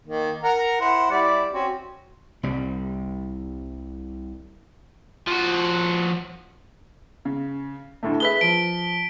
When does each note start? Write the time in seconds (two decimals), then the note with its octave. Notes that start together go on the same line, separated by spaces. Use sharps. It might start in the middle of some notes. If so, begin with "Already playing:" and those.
0.07 D#3 A#3
0.43 A#4 F#5 A#5
0.81 E4 C5 F#5
1.11 G3 E4 D5
1.53 C4 C#4 F#4
2.43 C2 G3
5.27 F3 F#4
7.25 C#3
8.03 D2 A2 A3
8.20 G#4 B4 E5 B6 G7
8.41 F3 D7